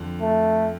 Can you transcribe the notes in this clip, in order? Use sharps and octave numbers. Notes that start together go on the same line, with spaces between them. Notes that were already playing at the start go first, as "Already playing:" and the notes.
Already playing: F2 D3 F3
A3